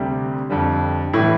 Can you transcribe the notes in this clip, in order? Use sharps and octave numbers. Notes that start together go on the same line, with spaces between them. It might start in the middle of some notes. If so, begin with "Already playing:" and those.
Already playing: D2 C3 G3
F2 D3 G3
A2 E3 G3 E4